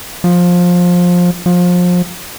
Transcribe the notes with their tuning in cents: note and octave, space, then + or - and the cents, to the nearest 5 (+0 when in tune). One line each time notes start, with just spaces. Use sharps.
F3 +20
F3 +30